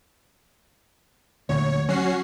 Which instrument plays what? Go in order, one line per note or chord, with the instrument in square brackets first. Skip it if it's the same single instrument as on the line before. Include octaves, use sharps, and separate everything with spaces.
[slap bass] D2 A#2 D3 [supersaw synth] C#5
[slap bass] F#3 [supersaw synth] C#4 F#4 C7